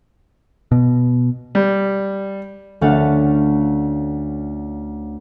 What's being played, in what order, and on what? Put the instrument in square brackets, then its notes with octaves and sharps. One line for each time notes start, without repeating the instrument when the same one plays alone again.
[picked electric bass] B2
[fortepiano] G3
[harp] D2 A3 C#4 F5 F#5 A5